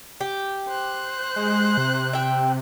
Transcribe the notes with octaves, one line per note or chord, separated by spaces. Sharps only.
G4
C5 F#6
G#3
C3
E5 G5